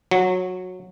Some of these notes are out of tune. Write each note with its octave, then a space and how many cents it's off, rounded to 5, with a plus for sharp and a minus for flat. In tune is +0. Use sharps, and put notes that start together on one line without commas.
F#3 -15